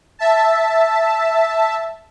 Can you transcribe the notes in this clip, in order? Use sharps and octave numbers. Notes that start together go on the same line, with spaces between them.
E5 A5